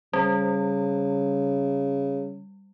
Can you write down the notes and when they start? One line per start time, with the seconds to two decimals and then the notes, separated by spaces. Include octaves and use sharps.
0.13 C#3 G3